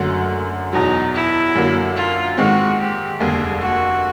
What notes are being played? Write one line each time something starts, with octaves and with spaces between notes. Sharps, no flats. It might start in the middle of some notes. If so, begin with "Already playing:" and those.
Already playing: F#1 F#2 D3 F#3 A3
E2 B2 F#3 D#4
E4
F#2 D3 F#3 A#3
F4
G#2 D#3 G#3 C4 F#4
G4
F1 D#2 D3 G3 A#3 G#4
F#4